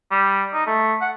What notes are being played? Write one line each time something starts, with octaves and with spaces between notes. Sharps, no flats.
G3
D#4
A3
F#5